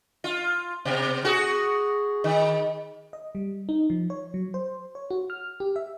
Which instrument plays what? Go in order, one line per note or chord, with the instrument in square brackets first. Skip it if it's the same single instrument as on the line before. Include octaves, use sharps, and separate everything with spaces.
[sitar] F4
B2
F#4 G#4
D#3
[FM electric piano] D#5
G3
D#4
F3
C#5
F#3
C5
C#5
F#4
F6
G4
E5